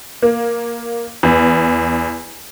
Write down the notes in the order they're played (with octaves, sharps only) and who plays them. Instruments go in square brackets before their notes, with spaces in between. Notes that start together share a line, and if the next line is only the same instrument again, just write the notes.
[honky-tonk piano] A#3
E2